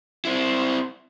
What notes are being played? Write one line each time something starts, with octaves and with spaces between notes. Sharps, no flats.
C4 E4